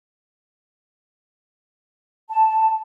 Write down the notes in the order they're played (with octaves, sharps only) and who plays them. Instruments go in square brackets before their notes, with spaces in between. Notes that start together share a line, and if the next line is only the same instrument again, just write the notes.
[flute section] A5